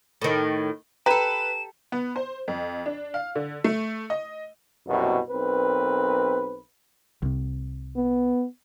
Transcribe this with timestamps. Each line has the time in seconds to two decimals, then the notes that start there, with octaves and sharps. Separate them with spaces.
0.22 A2 D#3
1.06 G4 A4 B4 A#5 E7
1.92 B3
2.16 C5
2.48 F2
2.86 D4
3.14 F5
3.36 D3
3.64 A3
4.10 D#5
4.87 C2 F#2 B2
5.30 B1 C4 A#4 B4
7.22 C2 C3
7.96 B3